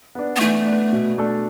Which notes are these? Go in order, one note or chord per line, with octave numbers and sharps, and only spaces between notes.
B3 D4
B3
E3 A3
B3 D4
B2
A3 D4 A4